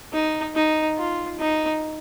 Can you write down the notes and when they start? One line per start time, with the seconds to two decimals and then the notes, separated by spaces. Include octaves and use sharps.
0.13 D#4
0.55 D#4
0.97 F4
1.38 D#4